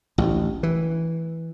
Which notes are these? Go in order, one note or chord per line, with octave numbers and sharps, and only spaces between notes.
A1 D2
E3